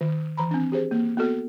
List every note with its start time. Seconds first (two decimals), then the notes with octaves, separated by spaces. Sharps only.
0.01 D#3
0.37 E3 A#5 B5
0.51 C4 D4
0.72 G4 G#4 C5
0.91 A#3
1.17 B3 F#4 A4